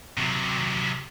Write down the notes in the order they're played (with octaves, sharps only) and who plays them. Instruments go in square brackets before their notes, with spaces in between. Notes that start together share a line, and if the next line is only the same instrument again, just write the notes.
[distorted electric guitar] C3 F#3